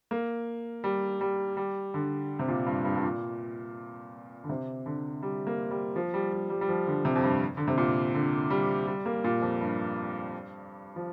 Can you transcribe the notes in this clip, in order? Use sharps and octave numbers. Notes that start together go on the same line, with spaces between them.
A#3
G3
G3
G3
D3
C3
A#2
G2
G2
G2
A#2
D3
C3
D3
G3
A#3
G3
F3
G3
G3
G3
G3
F3
D3
C3
F2
G2
D3
C3
A#2
D3
G3
G3
A#3
A#2
F2
G2
F3